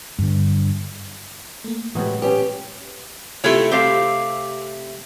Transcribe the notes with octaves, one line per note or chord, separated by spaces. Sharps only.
G2 D3
A3 A#3
A2 C3 E3 F#3 G#3 B3 C#6 D#6
C#4 G4 B4
C3 A3 E4 F4 A4
C4 G4 A4 C5 F5